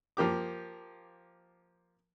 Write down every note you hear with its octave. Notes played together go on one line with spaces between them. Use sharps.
F3 A#3 G4 D6